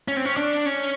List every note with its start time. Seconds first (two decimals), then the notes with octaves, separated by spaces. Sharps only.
0.08 C#4
0.17 C4
0.25 C#4
0.37 D4
0.66 C#4